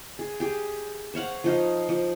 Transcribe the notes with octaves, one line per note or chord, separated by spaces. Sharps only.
G#4
G4 G#4
C5 C#5 F5 F#5
F3 D#4 F5
F3